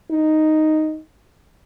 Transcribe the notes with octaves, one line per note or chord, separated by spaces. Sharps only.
D#4